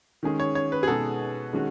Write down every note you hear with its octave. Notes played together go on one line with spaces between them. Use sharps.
D#3 G#3 C#4 G#4
C#5
C#5
B4
G#4
B2 G#3 D#4 A4
D#3 G#3 C#4 F#4